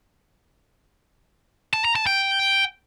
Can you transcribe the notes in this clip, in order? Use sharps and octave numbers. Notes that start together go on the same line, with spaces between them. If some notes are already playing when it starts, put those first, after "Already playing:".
A5
A#5
A5
G5